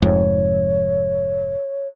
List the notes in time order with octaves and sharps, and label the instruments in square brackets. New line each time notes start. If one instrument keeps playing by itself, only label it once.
[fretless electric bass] F1 F2 G#2 [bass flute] C#5